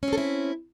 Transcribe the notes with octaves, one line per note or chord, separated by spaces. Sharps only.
C4 C#4 E4 A4